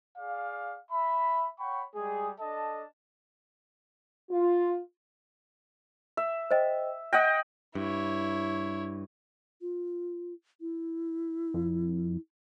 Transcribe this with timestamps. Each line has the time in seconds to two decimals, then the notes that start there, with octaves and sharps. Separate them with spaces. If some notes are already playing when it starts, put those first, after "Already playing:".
0.18 G#4 D5 F5
0.91 E5 B5
1.60 C#5 F#5 G5 B5 C#6
1.96 G3 G#3 G#4
2.40 D4 A4 D#5 A5
4.31 F4
6.17 E5
6.51 C5 D#5 G5
7.13 D#5 F#5 G5 A#6
7.75 G2 E4 C#5
9.61 F4
10.61 E4
11.54 F2